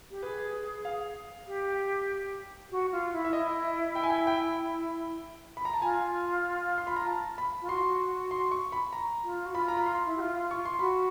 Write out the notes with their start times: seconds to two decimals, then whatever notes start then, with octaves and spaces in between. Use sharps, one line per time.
0.11 G4
0.23 G#4 B4
0.85 F5
1.47 G4
2.71 F#4
2.92 F4
3.13 E4
3.25 E5
3.33 E4 D#5
3.95 G5
4.03 G#5
4.10 G5
4.27 G5
5.57 B5
5.65 A#5
5.74 A5
5.82 F4 G#5
6.78 C6
6.87 B5
6.96 A#5
7.06 A5
7.38 B5
7.61 F4
7.68 F#4 C6
8.31 C6
8.51 C#6
8.72 B5
8.93 A#5
9.24 F4
9.46 F#4
9.55 F4 B5
9.68 A#5
9.77 B5
9.86 C6
10.06 E4
10.17 G4
10.20 F4
10.51 C#6
10.65 C6
10.79 F#4 B5